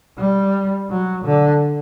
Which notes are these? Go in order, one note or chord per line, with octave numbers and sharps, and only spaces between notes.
G3
F#3
D3